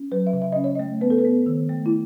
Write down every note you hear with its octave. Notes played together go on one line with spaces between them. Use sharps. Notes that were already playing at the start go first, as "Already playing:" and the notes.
Already playing: C#4
F#3 B4
E5
C#3
E5
C#4 D#5
C#5
A3 D#5
B3 B4
A4
B4
B3
D#3
A3
E4